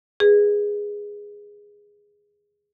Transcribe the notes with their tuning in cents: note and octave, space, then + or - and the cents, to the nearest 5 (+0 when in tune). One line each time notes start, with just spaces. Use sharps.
G#4 -10 B4 +0